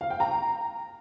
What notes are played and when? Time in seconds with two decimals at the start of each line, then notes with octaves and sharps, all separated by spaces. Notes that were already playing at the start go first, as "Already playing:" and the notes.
0.01 F5
0.10 G5
0.20 A#5